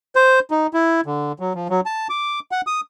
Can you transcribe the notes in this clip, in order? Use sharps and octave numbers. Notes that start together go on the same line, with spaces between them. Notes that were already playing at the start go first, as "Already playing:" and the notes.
C5
D#4
E4
D3
F#3
F3
F#3
A5
D6
F#5
D#6